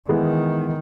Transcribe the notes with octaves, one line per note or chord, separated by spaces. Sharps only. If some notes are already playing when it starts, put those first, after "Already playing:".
D#3 E3 G#3 B3 E4